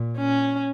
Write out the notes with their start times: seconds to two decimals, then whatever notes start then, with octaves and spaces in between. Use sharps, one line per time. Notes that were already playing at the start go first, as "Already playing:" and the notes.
Already playing: A#2
0.18 C#4